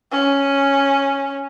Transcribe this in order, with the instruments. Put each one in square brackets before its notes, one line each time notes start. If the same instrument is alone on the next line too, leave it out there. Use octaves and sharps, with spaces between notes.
[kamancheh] C#4